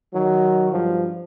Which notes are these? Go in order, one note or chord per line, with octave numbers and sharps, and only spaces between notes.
D#3 F#3
G2 F3